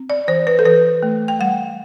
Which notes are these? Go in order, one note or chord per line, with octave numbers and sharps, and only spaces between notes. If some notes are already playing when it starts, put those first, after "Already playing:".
Already playing: C4
D5
E3 C5
B4
A4
E3 B4
A3
G5
G3 F#5